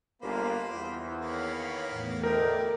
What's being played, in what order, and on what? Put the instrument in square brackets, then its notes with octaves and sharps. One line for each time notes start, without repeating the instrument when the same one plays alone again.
[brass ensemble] G1 A#3 [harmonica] F4 C5 B5
[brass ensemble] E2
[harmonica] D#3 A#3 B3 [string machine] C#5 F5 B5
[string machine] E2 A2
[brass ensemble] D2 D#5 G5 [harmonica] A3 E4 [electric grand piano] A#4 [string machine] D6